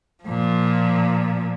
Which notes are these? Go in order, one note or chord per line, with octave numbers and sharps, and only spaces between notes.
A#2 F3